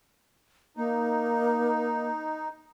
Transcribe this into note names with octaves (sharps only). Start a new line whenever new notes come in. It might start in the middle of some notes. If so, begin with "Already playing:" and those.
A#3 D#4